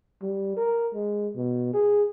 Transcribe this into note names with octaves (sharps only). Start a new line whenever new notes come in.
G3
A#4
G#3
B2
G#4